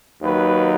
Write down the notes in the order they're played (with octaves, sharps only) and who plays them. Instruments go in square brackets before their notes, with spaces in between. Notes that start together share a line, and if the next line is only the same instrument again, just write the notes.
[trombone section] D#2 D#3 F#3 B4